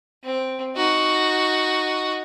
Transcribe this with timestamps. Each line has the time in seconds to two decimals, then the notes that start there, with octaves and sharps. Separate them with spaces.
0.23 C4
0.76 D#4 F#4